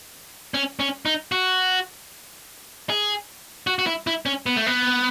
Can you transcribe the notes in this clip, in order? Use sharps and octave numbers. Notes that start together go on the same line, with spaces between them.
C#4
C#4
D#4
F#4
G#4
F#4
F#4
E4
E4
C#4
B3
A3
B3